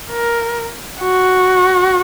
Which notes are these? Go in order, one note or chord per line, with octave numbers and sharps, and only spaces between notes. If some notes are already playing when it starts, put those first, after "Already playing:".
A#4
F#4